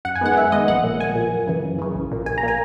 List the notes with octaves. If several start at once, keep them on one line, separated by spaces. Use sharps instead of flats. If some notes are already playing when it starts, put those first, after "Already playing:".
F#2 F#5
G#5
D#3 G#3 B3 F#5
F#2 E5
D#3 G#3 B3 D#5
A#1 F#5
A#2 A#3
A#1 G#5
A#2
A#3
F#2
C#3 E3
F#2
C#3 E3
A#1
A#2 A#3
A#1 G#5
A#5
A#2 A#3 G#5